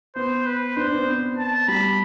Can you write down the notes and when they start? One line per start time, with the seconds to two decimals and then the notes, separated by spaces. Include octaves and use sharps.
0.15 B3 C5
0.46 B4
0.76 D4 C5
0.87 C4
0.97 B3
1.38 A5
1.68 G3 B5